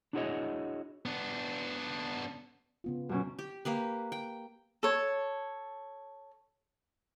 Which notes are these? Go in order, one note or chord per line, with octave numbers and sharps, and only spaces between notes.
D4 E4 F#4 G#4 C#5 D#5
B3 D4
C#3 B3 F4
F#2 B2 C#4
G4
A#3 G4 B4
G5
A4 C#5